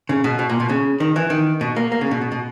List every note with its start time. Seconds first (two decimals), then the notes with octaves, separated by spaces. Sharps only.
0.09 C#3
0.24 B2
0.39 B2
0.50 A#2
0.60 B2
0.69 C#3
1.00 D#3
1.16 E3
1.30 D#3
1.61 B2
1.76 A#3
1.92 A#3
2.01 C#3
2.11 B2
2.21 B2
2.32 B2